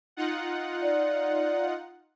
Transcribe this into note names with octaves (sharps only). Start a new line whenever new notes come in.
D#4 F4 F#5
D5